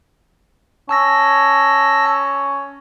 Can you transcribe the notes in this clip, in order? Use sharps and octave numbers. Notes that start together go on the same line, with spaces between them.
C#4 A5 E6 A#6